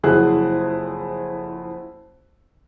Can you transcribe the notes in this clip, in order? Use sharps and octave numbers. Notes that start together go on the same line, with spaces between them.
F#1 F2 E4 F#4 G#4 F#6